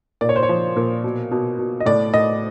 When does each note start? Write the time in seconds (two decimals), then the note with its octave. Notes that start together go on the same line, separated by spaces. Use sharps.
0.21 A#2 D5
0.29 C#5
0.36 C5
0.43 C#5
0.49 F3
0.76 A#2
1.04 B2
1.31 B2
1.59 B2
1.80 D#5
1.86 A2 D5
2.14 A2 D#5